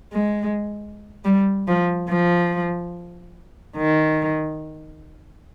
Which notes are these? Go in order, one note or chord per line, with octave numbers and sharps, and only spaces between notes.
G#3
G3
F3
F3
D#3